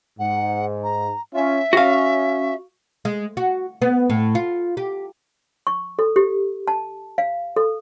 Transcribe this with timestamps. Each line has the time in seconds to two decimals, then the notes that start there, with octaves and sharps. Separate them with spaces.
0.19 G#2 F#5
0.83 A#5
1.34 C#4 F4 E5
1.73 C#4 F#4 F5
3.05 G#3
3.37 F#4
3.82 B3
4.10 A2
4.35 F4
4.77 G4
5.67 C#6
5.99 A4
6.16 G4
6.68 A5
7.18 F5
7.56 A4